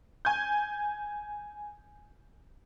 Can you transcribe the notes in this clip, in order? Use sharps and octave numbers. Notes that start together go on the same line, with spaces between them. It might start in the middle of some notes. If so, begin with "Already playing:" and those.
G#5 G6